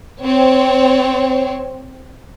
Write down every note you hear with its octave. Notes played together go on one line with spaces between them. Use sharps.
C4 C#5